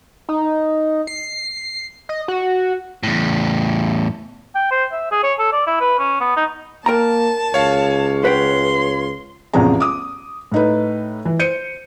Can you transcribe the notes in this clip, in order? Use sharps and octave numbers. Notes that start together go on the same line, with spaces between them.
D#4
C7
D#5
F#4
E2 A2
G5
C5
E5
G#4
C#5
A4
D5
E4
B4
C#4
B3
D#4
A#3 A#4 G5 A5 A#5
C#2 C#5 F5
B4 F#5 G5 C6
A1 E2 C3 F3 G#4 A#5
D6 D#6
A2 D#4 B4
E3
C5 G6 C#7 D#7